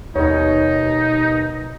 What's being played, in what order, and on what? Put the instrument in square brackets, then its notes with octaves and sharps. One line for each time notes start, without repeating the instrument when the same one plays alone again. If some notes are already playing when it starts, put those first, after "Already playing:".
[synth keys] D#2 B2 [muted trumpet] D#4 [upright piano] C#5